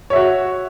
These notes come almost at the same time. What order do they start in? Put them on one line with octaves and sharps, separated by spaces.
C#5 E5 F#4